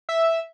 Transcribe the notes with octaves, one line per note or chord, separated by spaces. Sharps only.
E5